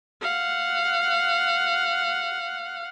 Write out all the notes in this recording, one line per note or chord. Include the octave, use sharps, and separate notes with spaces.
F5 F#5